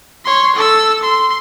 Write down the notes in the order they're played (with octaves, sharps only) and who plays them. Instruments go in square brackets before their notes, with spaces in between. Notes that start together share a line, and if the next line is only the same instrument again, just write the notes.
[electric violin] C#5 C6
A4 E6
C6